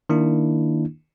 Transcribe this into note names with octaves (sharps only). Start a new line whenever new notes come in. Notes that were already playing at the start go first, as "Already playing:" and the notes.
D#3 A#3 D4 E4